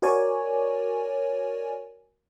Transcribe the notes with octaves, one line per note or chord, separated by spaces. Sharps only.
F#4 A#4 C#5 D5 G#5